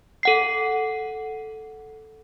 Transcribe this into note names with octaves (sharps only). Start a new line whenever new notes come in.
A4 F#5 C7